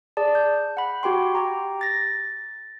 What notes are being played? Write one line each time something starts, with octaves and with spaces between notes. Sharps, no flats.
G#4 D5 A5
G6
F#5 B5
F#4 G4 G5 C6
G4 G5 A#5
A6 A#6